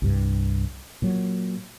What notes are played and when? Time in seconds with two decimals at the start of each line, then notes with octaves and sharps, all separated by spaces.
0.02 C2 G2
1.02 A#2 F#3